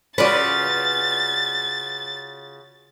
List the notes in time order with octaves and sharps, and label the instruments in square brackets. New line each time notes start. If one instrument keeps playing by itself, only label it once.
[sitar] C#3 F4 F#4 [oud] B4 D5 [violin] A6